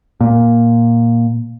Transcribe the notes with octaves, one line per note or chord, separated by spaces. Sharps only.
A#2